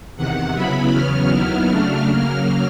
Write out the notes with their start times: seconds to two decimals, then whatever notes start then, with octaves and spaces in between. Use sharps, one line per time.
0.16 E2 C3 D#3 F#5
0.54 C#3 F#3 B3 E4 B5
0.92 E2 C#3 F#3 B3 F6
1.30 D#2 D#3 F#3 B3 E4 F6
1.68 C#3 F#3 A3 D4 F6
2.07 C#3 F#3 A#3 F6